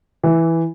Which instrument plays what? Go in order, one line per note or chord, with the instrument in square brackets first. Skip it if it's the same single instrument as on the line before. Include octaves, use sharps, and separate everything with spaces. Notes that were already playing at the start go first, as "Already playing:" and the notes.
[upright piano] E3